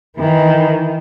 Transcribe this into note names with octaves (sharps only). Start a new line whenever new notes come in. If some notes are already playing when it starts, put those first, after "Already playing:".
D#3 E3